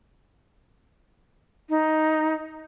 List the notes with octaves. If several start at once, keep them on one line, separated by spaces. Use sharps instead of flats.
D#4